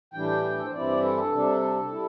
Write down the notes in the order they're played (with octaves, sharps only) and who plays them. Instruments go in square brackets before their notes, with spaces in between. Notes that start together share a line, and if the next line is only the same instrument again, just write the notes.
[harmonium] A2 E3 G3 D4 G5
A4
C5
G2 E3 G3 C4 E4 D5
A4
C3 G3 D4
G3 E4